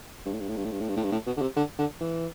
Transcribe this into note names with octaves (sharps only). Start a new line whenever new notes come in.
G2
A2
G2
A2
G2
A2
G2
A2
G2
A2
G2
A2
B2
D3
C3
D3
D3
E3